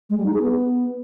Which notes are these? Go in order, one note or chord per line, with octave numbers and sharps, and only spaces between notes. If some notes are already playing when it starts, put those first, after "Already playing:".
G#3
G3
D#4
G#4
B3